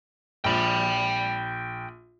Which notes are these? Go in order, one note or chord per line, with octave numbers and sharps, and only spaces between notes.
A#1 G5 B5